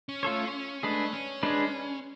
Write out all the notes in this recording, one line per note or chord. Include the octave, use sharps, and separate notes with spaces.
C#4
A3 F4 A4 C#5
G#3 A3 D4 G#4 B4
C#4
G#3 D4 G#4 B4